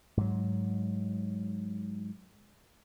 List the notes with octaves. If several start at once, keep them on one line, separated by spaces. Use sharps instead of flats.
G#2 F#3